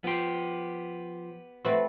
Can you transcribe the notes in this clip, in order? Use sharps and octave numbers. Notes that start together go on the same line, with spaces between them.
F3 B3 G4 C6
A3 C4 F#4 B4